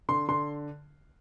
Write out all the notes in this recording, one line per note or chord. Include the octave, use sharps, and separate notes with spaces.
D3 C6
D3 C6